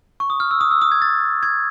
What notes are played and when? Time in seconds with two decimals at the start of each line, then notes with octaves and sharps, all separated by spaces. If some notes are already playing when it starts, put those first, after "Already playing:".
0.20 C#6
0.30 D#6
0.40 F6
0.51 E6
0.61 D#6
0.71 E6
0.82 D#6
0.92 G#6
1.02 A6
1.43 G#6